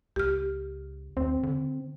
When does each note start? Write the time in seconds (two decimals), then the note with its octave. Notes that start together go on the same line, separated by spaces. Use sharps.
0.16 C#2 G4 F6
1.17 D#2 C4
1.43 D3